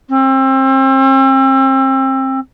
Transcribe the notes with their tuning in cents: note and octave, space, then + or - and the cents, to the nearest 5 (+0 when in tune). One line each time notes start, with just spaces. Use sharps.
C4 +35